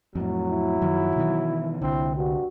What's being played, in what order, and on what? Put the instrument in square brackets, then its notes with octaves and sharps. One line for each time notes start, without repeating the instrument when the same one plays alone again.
[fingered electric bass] F2 A2 [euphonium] F#3
[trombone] E4
[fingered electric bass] F#2 D#3 F3
B2 D#3 E3
[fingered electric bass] C2 D3 [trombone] C4 [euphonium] E4
[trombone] G2 [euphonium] F#4